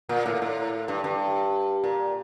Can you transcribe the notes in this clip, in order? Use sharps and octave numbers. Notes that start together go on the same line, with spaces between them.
A#2
A2
A2
G2
G2
A#2